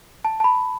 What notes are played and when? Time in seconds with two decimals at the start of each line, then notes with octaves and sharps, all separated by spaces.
0.25 A5
0.40 A5
0.44 B5